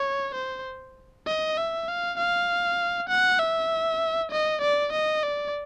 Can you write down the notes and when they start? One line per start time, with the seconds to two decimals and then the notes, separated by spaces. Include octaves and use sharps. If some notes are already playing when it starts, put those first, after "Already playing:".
Already playing: C#5
0.35 C5
1.27 D#5
1.57 E5
1.88 F5
2.18 F5
3.09 F#5
3.39 E5
4.32 D#5
4.61 D5
4.92 D#5
5.23 D5